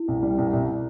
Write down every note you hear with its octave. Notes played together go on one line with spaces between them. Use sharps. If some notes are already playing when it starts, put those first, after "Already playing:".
Already playing: E4
C2
G3
C2
C2